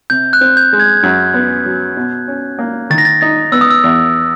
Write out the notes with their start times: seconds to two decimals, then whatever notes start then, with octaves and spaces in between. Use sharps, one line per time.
0.10 C3 G6
0.33 F#6
0.41 C4
0.57 G6
0.73 G#3
0.80 G#6
1.03 F#2
1.34 B3
1.66 F#3
1.97 B2
2.28 C#4
2.59 A#3
2.90 D#3 A6
2.98 A#6
3.05 A6
3.21 D#4 A6
3.52 B3 E6
3.61 D#6
3.71 E6
3.84 E2